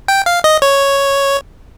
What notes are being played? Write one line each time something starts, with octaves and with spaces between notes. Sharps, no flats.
G5
F5
D#5
C#5